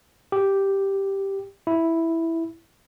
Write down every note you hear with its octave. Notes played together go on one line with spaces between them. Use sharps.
G4
E4